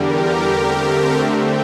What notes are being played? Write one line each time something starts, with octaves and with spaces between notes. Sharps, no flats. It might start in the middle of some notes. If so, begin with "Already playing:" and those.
Already playing: E2 D3 G3 G4 A#4
D3 A3 C4
E5 G5